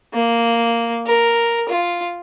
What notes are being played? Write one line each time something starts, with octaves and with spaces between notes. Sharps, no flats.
A#3
A#4
F4